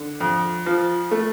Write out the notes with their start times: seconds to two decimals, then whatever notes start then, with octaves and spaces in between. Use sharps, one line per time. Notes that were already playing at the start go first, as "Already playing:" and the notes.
Already playing: D3
0.20 F2
0.66 F3
1.11 A3